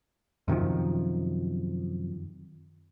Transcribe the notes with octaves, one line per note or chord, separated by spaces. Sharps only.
F#2 C3 D#3 F3